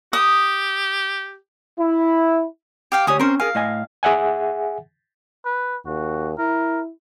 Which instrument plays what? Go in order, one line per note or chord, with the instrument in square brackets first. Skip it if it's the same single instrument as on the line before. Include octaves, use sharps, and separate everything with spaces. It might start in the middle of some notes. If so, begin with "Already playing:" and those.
[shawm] G4 [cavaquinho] D#6
[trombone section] E4
[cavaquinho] G4 F5 G5
[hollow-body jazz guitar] D2 G4 C#5 [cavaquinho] G#5 D#6
[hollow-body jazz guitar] C4 C#4 [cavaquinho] A#4 C5
[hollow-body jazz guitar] G#4 A#4 G#5 [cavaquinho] F5
[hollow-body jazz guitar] A2 D#5 G#5
[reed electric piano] G#4 E5 F#5 G#5
[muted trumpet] B4
[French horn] D#2 [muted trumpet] F#4
[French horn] E4 [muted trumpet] A#4